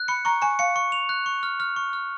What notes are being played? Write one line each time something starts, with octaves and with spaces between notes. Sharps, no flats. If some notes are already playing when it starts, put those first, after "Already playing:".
Already playing: F#6
B5 C#7
A#5 C#6
G#5 C#6
F5 C#7
C#6
F7
F#6
C#6
F6
F6
C#6
F6